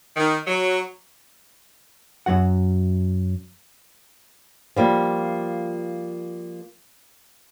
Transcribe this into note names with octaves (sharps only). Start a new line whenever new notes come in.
D#3
F#3
F#2 F#3 F#4 F#5
F3 G3 A#3